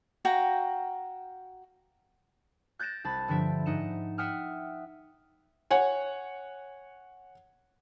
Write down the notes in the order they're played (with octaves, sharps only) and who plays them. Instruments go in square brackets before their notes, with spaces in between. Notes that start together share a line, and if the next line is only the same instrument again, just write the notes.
[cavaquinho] F#4 F5 G5 A#5
[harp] F#6 G6 A6 A#6 D7 E7
C2 A5 B5 A6
G2 D3 F3 E5 D7
G#2 D#4 F#5 E7
E5 F#5 G5 D#6 F6 F#6
[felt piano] C#5 F#5 G#5